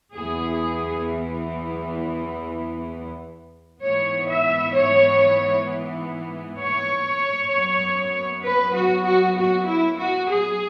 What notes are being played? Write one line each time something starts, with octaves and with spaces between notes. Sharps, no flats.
E2 E3 B3 G#4
G#2 E3 B3 C#5
E5
C#5
C#5
F#2 F#3 B3
B4
F#4
F#4
F#4
E4
F#4
G#4